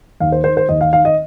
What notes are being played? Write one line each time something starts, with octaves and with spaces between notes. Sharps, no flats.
D#2 F5
C5
D#3 C5
C5
D#2 D#5
F5
D#3 F5
D#5